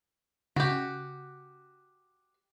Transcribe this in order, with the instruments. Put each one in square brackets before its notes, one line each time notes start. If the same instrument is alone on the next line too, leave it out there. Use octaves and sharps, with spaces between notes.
[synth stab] C#3 [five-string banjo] F#4 G4